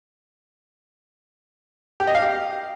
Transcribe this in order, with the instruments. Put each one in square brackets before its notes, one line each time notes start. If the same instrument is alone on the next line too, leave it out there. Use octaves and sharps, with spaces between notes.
[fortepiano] G4
D#5
F5
G4